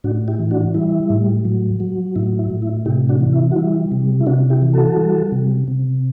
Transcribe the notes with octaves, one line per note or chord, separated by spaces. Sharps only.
A2 D4 F#4
E4 G4
E3
D4 F#4
G3 E4
A2
F#3
F#3
A2 E4
E4
A2
E4
C3 E4 G4
D4 F#4
E3
E4
F#4
G3 E4
C3
E4
C3 D4 F#4
E4 G4
E3
F#4 A4
G3
C3
C3